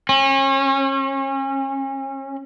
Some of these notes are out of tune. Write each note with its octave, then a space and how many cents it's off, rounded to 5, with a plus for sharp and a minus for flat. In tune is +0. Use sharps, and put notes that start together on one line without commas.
C#4 -35